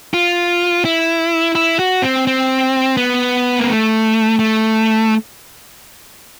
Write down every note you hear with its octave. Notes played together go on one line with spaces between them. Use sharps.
F4
E4
E4
F#4
C4
C4
B3
A#3
A3
A3